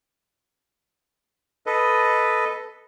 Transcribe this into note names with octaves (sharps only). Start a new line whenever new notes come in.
A4 B4 D#5